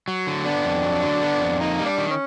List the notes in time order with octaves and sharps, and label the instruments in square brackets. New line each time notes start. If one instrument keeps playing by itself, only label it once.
[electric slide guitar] F#3
D3
[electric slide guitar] B3 [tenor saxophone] D4
[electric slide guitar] F2
F#3
D3
B3
F2
[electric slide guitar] A#3 [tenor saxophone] D#4
[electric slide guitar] G3
[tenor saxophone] D4
[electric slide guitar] D#3
[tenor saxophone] C#4